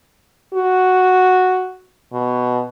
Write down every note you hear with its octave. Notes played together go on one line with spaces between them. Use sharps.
F#4
B2